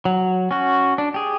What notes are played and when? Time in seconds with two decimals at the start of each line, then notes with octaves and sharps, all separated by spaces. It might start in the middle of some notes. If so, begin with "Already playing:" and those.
0.05 F#3
0.51 C#4 F#4
0.98 D4
1.14 G4 G#4